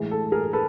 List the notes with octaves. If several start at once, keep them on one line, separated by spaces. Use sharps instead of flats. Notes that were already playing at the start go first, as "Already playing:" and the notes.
Already playing: A2 E3 G#3
A4
G#4 A#4
A4 B4